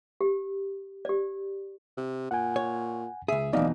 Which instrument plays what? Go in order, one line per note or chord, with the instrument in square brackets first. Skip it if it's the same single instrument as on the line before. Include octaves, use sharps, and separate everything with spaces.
[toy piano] G4
G4 D5
[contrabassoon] C3
[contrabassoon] A#2 [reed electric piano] F#5 G#5
[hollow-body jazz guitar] C#5
[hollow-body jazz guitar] C#2 G#4 [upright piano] E5
[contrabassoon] D1 [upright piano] B2 [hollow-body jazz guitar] E3 D#4 [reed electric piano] D5 D#5 F5